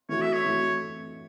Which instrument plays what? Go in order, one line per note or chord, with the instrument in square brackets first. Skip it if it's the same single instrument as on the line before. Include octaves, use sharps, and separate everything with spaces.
[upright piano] E3 A3 F#4 [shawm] C#5
[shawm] E5
C#5
[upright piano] E3 A3 F#4